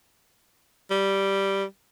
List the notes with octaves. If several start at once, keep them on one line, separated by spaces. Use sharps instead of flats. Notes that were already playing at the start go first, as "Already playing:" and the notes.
G3